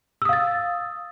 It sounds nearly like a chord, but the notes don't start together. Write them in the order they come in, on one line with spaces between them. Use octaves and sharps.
E6 D#6 F5 A6